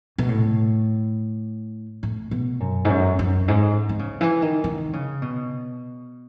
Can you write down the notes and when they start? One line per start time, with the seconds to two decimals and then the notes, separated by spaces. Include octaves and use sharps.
0.18 B2
0.29 A2
2.03 A2
2.31 B2
2.60 F#2
2.85 G#2
2.90 F#2
3.19 F#2
3.48 G#2
3.89 D#3
3.99 C#3
4.21 E3
4.42 D#3
4.64 D#3
4.93 C#3
5.22 B2